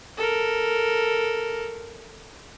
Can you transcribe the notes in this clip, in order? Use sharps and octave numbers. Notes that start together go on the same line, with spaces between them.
A4 A#4